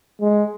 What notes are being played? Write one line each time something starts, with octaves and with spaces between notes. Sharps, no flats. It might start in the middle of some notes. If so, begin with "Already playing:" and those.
G#3